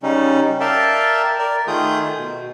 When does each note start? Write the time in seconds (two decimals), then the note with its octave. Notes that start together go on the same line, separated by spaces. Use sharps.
0.03 C#3 G3 C#4 D#4
0.60 A#4 D5 E5 F5 G5 A5
1.39 A#4 D5
1.67 D#3 A3 F4 G#4 D#6 G6
2.18 B2